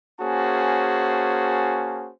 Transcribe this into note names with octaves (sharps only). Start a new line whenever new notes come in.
A#3 C#4 F#4 G#4 C5 A5